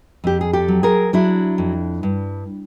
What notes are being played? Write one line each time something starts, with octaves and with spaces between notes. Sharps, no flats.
F2 G4
G#4
G4 A4
F#3
G#4 A#4
F#3 D4 E4
F2
G2